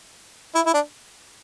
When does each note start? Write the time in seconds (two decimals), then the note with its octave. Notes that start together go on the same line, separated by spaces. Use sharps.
0.55 E4
0.66 E4
0.74 D4